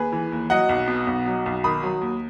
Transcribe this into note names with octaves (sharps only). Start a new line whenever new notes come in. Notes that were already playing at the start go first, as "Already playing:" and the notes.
Already playing: D#2 G#4 B4
E3
D#2
F#3 D#5 F#5
B1
B2
B1
F#3
B1
D#3 B5 D#6
F#3
D#2